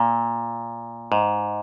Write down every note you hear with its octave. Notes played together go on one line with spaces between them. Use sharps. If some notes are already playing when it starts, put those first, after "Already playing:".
Already playing: A#2
G#2